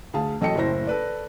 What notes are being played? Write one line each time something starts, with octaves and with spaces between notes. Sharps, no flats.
D2 G#4 F5 A5
A1 F#3 A4 D#5 G5 C#7
F#1 A2 E4 C5 A#6
A4 B4 D5